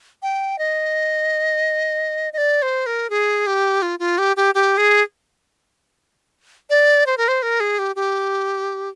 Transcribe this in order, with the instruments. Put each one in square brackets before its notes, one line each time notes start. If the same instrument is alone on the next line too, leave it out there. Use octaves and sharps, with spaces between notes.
[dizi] G5
D#5
D#5
D5
C5
A#4
G#4
G4
F4
F4
G4
G4
G4
G#4
D5
C5
A#4
C5
A#4
G#4
G4
G4